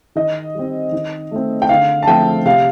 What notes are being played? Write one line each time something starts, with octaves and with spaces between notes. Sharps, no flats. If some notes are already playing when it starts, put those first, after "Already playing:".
D#3 D#5
G3 C4
D#3
A3 C4
G5
D3 F5
A5
F3 A3 C4 G5
C3 F5